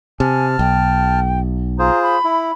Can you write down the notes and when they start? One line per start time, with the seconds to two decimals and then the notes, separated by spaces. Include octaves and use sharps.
0.20 C3 G#5 A5 F6
0.59 B1 G5
1.79 F4 G#4 C5 A#5
2.02 B5
2.24 E4